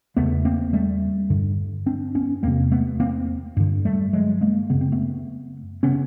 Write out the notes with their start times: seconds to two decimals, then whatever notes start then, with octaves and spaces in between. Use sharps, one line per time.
0.16 E2 C#3 A3 B3
0.45 A#3 C4
0.73 G3 A3
1.30 G2 D3
1.86 C4 D4
2.15 B3 C#4
2.43 E2 C3 A#3 C4
2.71 A3 B3
3.00 A#3 C4
3.57 G2 D3
3.85 G3 A3
4.13 F#3 G#3
4.41 G#3 A#3
4.70 F#2 C#3 B3
4.81 C4
4.92 A3 B3
5.83 C#3 B3 C#4